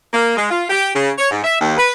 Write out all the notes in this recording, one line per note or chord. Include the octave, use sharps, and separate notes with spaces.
A#3
G#3
F4
G4
C#3
C#5
G#2
E5
D#2
B4